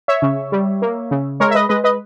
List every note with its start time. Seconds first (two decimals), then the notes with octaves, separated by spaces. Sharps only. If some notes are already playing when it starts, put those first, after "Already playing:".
0.08 C#5 E5
0.22 C#3
0.52 G3
0.82 A#3
1.11 C#3
1.40 G#3 A#4 C#5
1.51 E5
1.55 B4 D#5
1.69 G#3 B4 D#5
1.84 B4 D#5